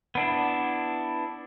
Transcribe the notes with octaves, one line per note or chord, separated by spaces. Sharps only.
B3 D4 E4